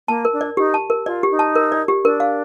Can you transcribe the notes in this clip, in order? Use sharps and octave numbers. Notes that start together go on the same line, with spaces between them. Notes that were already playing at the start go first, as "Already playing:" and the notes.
A#3 A5
A#4
D4
D5
D#4 G4
A5
A#4
F4 D5
G4
D#4
A5
A#4
D5
G4
D4 A#4
F5